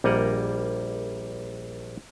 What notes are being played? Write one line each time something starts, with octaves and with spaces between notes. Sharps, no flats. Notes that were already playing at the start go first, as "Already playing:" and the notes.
A#1 G3 A#3 A#4 D#5 F#5